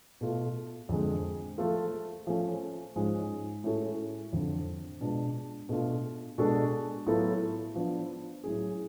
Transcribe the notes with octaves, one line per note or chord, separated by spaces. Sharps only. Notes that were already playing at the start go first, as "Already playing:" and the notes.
B2 A3 F4
F2 D3 G#3
F3 A3 F4 A4
F3 A3 C#4
G#2 F3 G#3 C#4
A2 G#3 C#4 F#4 A4
F2 D3 F3
B2 G#3 D4 F4
B2 A3 D4 F4
B2 G#3 D4 F#4 A4
A2 F#3 B3 F4 A4
F3 B3 D4
A2 F#3 C#4 G#4